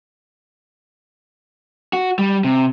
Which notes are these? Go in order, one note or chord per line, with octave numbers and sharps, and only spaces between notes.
F#4
G3
C3